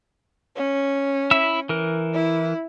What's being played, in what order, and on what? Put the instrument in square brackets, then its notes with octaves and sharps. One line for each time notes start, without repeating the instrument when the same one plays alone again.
[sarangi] C#4
[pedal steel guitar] E4 E5 E6
E3 A#4
[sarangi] E4